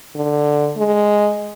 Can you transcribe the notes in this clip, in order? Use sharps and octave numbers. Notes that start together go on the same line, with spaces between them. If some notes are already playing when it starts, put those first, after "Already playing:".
D3
G#3